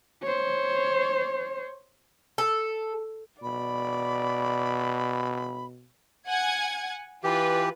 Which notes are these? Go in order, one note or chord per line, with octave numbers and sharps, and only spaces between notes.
C5 C#5
A4
B2 D5 B5
F#5 G#5 G#6
E3 F4 G4 B4